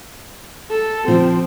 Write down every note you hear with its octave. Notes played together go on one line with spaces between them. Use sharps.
A4
F3 C4